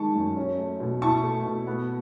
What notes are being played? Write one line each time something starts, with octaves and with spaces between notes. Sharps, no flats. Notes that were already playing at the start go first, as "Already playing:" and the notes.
Already playing: D#3 G#3 A5 C#6
F#2
C#4
A3
B2
E4 A5 C#6
A3
B2
B3